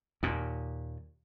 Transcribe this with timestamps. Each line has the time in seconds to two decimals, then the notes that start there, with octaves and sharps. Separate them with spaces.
0.23 D#2 A#2